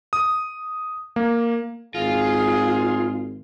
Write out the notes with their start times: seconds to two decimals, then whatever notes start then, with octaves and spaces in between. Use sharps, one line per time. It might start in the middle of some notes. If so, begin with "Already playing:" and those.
0.13 D#6
1.16 A#3
1.95 G#1 F4 G#4